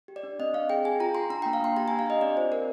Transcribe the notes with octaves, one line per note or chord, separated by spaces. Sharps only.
G4
D5
D4
C4 D#5
C4 F5
G#4 G5
G#4 G#5
F4 A#5
F4 C6
D4 A#5
A#3 G5
F5
A#3 C6
G4 A#5
D4 G#5
F5
G4 D#5
C4 D5
F4 C5
C4 A#4